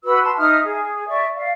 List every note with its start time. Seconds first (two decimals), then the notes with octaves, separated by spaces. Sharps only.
0.04 F#4 B4 B5 E6
0.22 A5 C6
0.37 D#4 E5 D#6 F6
0.64 G#4
1.08 D5 E5 C#6
1.36 D5 F5